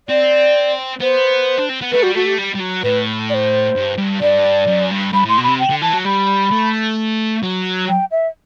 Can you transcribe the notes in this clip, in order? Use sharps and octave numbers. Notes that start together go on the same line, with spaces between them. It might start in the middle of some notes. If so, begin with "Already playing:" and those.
C4 D5
B3 C5
D4
C4
B3
A3 B4
G3 F#4
A3 F#4
G4
G3
G3
F#3
A2 B4
D5
C5
G2
G2
G2 D5
F#2
G2
G2 B5
A2 C6
B2
C3 B5
G5
D3
E3 A5
F#3
G3 B5
A3
F#3
G5
E5